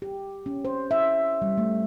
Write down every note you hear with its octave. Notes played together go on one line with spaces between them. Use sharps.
G4
C#4
C5
E5
G3
A3